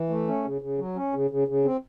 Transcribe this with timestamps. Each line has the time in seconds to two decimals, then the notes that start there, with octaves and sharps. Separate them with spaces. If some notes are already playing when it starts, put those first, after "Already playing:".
Already playing: E3
0.10 A3
0.28 C#4
0.45 C#3
0.61 C#3
0.78 F#3
0.96 C#4
1.13 C#3
1.30 C#3
1.48 C#3
1.65 C4